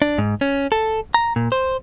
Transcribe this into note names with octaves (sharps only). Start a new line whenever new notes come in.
D4
G#2
C#4
A4
A#5
A#2
C5